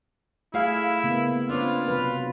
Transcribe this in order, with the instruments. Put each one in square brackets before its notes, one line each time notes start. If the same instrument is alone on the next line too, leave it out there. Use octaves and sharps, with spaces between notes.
[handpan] A3 [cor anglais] E4 [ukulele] G#4 F5
[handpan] C#3 A#3 B3
[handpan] C4 B4 [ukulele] D4 C#5 [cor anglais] F4
[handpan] C3 F#3 B4